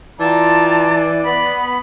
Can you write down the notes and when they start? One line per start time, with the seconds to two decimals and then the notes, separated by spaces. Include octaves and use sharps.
0.20 E3 F4 D5 G5 A5 A#5
1.24 B3 B5